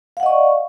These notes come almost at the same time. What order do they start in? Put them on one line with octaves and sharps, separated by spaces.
F5 F#5 D#5 C#6 D5